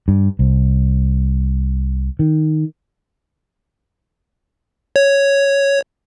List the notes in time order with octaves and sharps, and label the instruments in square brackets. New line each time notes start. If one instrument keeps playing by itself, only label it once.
[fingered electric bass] G2
C2
D#3
[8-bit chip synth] C#5